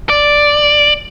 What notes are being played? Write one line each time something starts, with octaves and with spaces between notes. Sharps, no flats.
D5